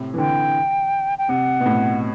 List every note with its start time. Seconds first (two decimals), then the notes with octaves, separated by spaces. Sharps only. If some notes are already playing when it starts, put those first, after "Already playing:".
Already playing: A2 C3
0.14 E3
0.18 D3 G5
1.18 G5
1.29 C3 F#5
1.60 B2
1.66 A2